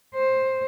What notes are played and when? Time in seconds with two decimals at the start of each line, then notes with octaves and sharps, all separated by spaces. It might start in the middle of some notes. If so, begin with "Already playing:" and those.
0.15 C5